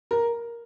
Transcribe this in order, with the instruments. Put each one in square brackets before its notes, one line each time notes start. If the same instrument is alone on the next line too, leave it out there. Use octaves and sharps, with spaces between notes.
[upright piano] A#4